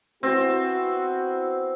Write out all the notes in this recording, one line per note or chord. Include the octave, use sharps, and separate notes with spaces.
B3 C4 E4 F#4